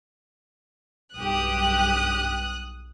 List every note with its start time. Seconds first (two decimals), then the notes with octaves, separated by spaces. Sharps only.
1.15 B1 G2 G4 D#6 F#6